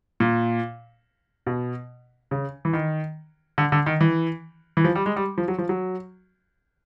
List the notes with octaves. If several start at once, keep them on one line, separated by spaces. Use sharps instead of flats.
A#2
B2
C#3
E3
D#3
D3
D3
D#3
E3
E3
F3
G3
G#3
G3
F3
F#3
F3
F#3